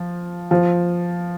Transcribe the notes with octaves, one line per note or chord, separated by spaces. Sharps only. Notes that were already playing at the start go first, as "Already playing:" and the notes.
Already playing: F3
F3